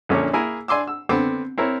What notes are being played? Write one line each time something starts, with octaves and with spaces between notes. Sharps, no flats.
A#1 A#2 D3 F3 C#4 C#5
A#3 E4 G#4 A#4 G#5
D4 G#5 C6 D6 E6
E6
D3 B3 C4 D6
C4 E4 A#4 C#5